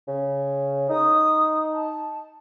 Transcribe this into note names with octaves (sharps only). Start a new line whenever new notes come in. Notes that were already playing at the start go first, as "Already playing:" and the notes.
C#3
D#4 D#6
A5